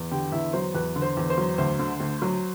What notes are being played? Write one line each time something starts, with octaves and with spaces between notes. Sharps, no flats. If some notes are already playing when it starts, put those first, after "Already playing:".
Already playing: E2
D3 G4 G5
E2 E4 E5
F#3 C5
E2 B4
D3
C5
E2
C5
F#3
D2 C5
D3
D2
F#3